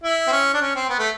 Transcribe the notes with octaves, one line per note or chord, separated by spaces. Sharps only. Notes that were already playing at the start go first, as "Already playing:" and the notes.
E4
C4
C#4
D4
C#4
C4
B3
A3